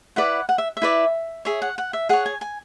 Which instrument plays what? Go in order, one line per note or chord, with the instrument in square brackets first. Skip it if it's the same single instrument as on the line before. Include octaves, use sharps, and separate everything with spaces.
[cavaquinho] E4 B4 D5 F#5
F#5
E5
E5
E4 B4 D5
G#4 C#5 E5
F#5
F#5
E5
G#4 C#5 F#5
G#5
G#5